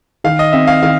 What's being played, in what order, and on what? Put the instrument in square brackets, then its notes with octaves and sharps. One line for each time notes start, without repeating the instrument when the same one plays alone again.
[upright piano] D#3 [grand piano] F5
[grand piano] D#5
[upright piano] C4 [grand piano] E5
[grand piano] F5
[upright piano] D#3 [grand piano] F5